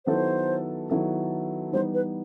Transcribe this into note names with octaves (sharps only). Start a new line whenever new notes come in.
D#3 F#3 B3 E4 A4 C5
D#3 F#3 B3 E4 A4
E3 G3 B3 D#4 C5
B4